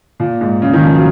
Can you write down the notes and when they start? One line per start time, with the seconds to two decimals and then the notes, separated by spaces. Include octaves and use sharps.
0.20 A#2
0.41 G#2
0.62 C#3
0.73 D#3
0.84 F3
0.94 F#3